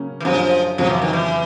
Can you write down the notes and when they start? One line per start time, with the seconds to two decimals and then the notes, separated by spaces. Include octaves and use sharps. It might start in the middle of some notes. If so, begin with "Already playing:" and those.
Already playing: C#3 F#3 A#3 C#4
0.20 E3
0.25 F#2 D3 F3 G3
0.78 F2 C#3 F3 F#3
0.89 E3
1.02 D#3
1.13 E3